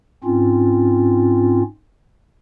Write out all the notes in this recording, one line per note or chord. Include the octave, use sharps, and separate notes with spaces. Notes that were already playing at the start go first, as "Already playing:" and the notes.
G#2 C4 C#4 F4